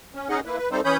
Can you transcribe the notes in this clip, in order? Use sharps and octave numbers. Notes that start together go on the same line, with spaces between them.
C#4
C#4 D#4 G#4 D#5 F#5
A#3 E4 B4
B4
G3 A3 C4 D#4 A4 C5
E3 C#4 C#5 B5 D#6 G6